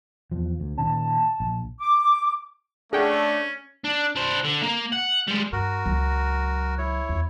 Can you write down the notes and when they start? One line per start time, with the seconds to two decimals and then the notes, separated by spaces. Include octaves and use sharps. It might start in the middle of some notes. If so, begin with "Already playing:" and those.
0.32 E2 F3
0.60 D2
0.78 A#2 D#3 C#4 A5
1.40 A#1
1.80 D6
2.93 A3 C#4 D4 G#4 F#5 G5
3.85 D4
4.16 D4 C5
4.44 D3
4.63 A#3
4.92 F#5
5.27 G3 G#3
5.52 G2 F#4 A#4
5.86 C#2 F#3
6.78 E4 C#5
7.09 E2